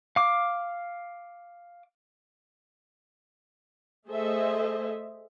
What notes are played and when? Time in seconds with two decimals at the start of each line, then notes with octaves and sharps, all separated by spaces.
0.16 F5 D6
4.07 A3 G#4 A4 C5 D#5 E5